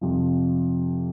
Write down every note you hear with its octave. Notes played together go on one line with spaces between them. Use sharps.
F2 C3 F3